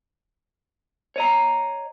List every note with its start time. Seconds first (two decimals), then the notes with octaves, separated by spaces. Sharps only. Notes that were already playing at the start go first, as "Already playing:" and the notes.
1.16 C#5 D#5 A#5